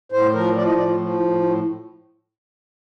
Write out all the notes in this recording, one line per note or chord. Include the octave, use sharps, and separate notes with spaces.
A2 C5
F3 A#4
F3 D5
D#5
A2 D5
F4
F3
A2
A2